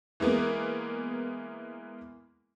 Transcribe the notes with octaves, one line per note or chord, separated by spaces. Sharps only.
E3 G#3 A#3 B3